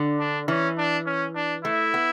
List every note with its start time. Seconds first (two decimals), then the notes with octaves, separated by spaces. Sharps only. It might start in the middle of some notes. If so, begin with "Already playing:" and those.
Already playing: D3
0.19 D4
0.48 E3 C#4
0.78 D4
1.06 C#4
1.36 D4
1.64 A3 E4
1.94 B3